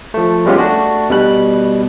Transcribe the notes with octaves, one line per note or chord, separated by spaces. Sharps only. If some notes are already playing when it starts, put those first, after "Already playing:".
F3 A3
G3 G#3 B3 C#4 F4 G4
A3 D4 F#4
B2 G3 F#6